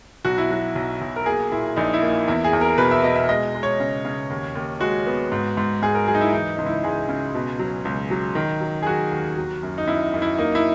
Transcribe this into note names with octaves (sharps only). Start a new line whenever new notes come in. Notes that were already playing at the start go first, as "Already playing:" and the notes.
B1 F#4
E4
F#3 F#4
B1
B1
A#4
A#3 G#4
A#2 E4
A#1 D#4
E4
A#3
E2 E4
G#4
E2
A#4
B2 B4
E5
B2 D#5
E5
G#3 D#5
G#3
C#5
C#3
C#3
D#2
D#2
G#3 F#4
B3
G#2
G#2
G#2 G#4
A#4
F#3 G#4
D#4
E4
E3 D#4
C#2 D#4
E4
C#2 G#4
C#3
B2
F#3
C#2
F#3
D#3
F#3
G#4
F#3 F#4
D#2
F#3
F#2
D#4
F#2 E4
F#2
E4
A#3 D#4
E4